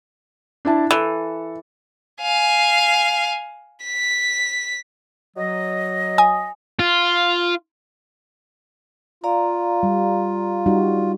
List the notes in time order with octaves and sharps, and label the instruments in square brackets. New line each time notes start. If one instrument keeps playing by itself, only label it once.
[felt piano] D4 E4 A5
[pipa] E3 [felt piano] A4
[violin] F5 G#5
B6
[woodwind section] F#3 D#5
[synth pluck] G#5 D#6
[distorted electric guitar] F4
[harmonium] F4 [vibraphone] D5 F5 A#5
[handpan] G3
G3 D#4 F#4